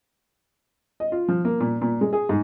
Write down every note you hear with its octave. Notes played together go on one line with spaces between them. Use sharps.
D#5
F4
F3
A#3
A#2
A#2
G#3
G#4
G#2